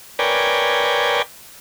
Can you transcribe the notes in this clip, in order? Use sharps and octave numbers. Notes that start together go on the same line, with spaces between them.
A#4 B4 C#5 D5 G5 G#5